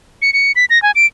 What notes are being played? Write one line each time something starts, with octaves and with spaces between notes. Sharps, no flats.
C#7
C#7
B6
A#6
G#5
D7